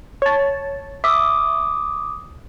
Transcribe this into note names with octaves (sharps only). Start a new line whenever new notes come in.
C#5 A5
E5 D6 D#6